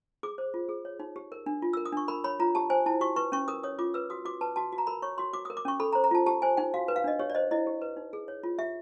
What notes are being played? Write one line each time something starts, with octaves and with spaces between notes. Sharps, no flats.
G#4 D6
C5
F4
G#4
C#5
D#4
G4
A#4
D4
F4
E6
A#4
D#6
D4 C#6
A#4 B5
C#5 B5
F4 A#5
G4 A5
C5 G#5
E4 A5
F#4 C#6
B4 C#6
C#4 C#6
A#4 D#6
C#5 D#6
F4 D6
B4 E6
F#4 D#6
F#4 D6
B4 A5
F#4 A5
F#4
A#5
A#4 B5
C#5 C#6
F#4 C6
F#4 D6
D#6
A#4
D6
C#4 C#6
A4 B5
A#5
C5
A#5
F4 A5
G4 A5
C5 G#5
D#4 G5
F#4 F5
B4
F5
D4 D#5
G4 C#5
D5
C5 D#5
E4 D#5
G4
B4
D#4
G#4
C#5
F4
G4 E5